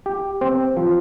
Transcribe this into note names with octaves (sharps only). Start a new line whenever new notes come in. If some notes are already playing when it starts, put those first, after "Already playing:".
G4
C4
F3